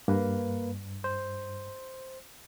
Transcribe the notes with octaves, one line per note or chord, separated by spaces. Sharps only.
G2 A#3 B4
C5